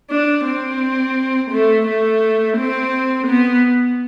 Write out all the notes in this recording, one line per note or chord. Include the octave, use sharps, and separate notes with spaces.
D4
C4
A3
A3
C4
B3